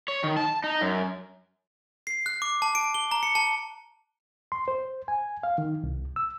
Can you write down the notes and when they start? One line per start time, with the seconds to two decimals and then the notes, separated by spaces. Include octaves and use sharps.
0.08 C#5
0.24 D#3
0.37 A5
0.64 D#4
0.81 F#2
2.07 C7
2.26 F#6
2.42 D6
2.62 A5
2.75 D7
2.94 G7
3.11 A#5
3.23 C#7
3.35 A5
4.52 C6
4.68 C5
5.08 G#5
5.43 F5
5.58 D#3
5.83 C2
6.16 E6